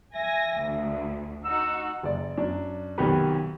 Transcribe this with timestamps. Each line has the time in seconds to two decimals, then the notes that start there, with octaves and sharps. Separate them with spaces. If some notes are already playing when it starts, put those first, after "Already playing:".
0.15 E5 G#5 A#6
0.59 D2
1.45 D#4 F#4 E6
2.03 F#1 D5
2.38 F#2 D4
2.98 B1 C3 D#3 B3 G4 B4